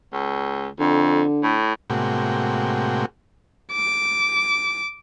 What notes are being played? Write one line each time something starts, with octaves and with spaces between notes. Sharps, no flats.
C#2
F2 D3
A2
A2 C3 G#3 A#3 F#4 G5
D6